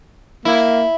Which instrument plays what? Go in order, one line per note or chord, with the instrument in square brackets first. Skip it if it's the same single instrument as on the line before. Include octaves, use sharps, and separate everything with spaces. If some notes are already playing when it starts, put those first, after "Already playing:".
[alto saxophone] A#3 [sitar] E4